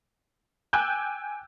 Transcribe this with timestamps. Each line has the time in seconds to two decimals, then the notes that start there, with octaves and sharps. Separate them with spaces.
0.73 G5 G#5 D6 E6 F#6 G6